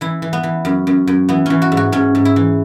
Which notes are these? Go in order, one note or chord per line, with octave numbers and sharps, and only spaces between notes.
E3 E4
E3
B3
E3
F#2
F#2
F#2
E3 B3
E3 C#4
F#4
G#2
F#4
G#2 C#4
G#2
E4
E3